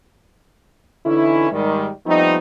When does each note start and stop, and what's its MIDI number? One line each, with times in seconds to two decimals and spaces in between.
1.06 1.51 50
1.06 1.51 52
1.06 1.51 61
1.06 1.51 63
1.06 1.51 64
1.52 1.89 44
1.52 1.89 51
1.52 1.89 55
2.06 2.37 53
2.06 2.37 55
2.06 2.37 57
2.06 2.37 59
2.06 2.37 60
2.06 2.37 63